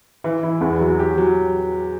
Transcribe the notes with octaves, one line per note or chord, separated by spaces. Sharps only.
E3
E4
E2
F#3
G4
F#3